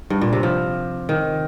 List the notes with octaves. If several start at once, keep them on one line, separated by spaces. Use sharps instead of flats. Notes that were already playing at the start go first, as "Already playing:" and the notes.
G2
A#2
C3
F3
D#3